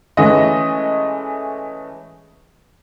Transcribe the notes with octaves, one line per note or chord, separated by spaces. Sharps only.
E3 G#3 A3 C#4 D#5